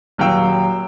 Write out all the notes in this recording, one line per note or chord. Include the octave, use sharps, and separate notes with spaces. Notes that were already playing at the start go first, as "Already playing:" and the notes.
D#1 F#3 F5 G5 E6